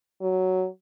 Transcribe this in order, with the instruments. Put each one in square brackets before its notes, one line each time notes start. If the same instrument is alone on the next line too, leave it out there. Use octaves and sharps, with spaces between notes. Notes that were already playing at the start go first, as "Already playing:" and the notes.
[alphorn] F#3